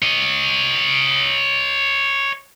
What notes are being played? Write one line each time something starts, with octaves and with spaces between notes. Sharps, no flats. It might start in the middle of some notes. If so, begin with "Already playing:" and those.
C#5 D#5